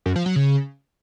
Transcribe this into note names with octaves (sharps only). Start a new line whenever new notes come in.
F#2
F3
F#3
C#3